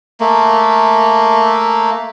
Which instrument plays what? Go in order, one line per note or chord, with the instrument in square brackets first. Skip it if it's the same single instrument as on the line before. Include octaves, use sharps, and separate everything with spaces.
[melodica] A3 A#3